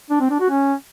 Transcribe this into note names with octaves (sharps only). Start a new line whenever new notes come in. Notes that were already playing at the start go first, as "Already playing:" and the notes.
D4
C4
D4
F#4
C#4